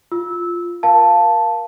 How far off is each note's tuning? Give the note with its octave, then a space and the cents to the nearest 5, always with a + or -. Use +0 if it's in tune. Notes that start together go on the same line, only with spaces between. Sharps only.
F4 +0 E6 -15
A#4 +25 F5 -5 A5 +0